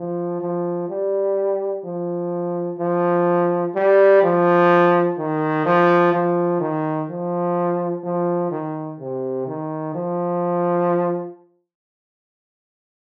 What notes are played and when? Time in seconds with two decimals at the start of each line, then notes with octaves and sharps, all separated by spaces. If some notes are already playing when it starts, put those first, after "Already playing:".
Already playing: F3
0.41 F3
0.89 G3
1.84 F3
2.79 F3
3.75 G3
4.23 F3
5.18 D#3
5.66 F3
6.13 F3
6.61 D#3
7.09 F3
8.04 F3
8.51 D#3
8.99 C3
9.47 D#3
9.95 F3